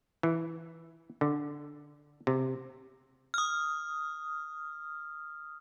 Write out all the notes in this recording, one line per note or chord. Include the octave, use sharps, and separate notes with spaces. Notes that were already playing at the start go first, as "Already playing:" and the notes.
E3
D3
C3
D#6 F6